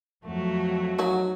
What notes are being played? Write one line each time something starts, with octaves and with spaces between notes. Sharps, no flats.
F2 F#3 A3 F#4
F#3 D#4 C#5 F#5